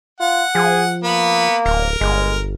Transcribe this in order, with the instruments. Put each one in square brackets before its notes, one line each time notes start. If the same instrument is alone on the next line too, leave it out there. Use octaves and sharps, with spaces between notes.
[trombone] F4 [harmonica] F#5
[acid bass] F3 [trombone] G#4
[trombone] A#3 [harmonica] B3 B5
[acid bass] D1 [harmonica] A#4
[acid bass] G1 [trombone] G#3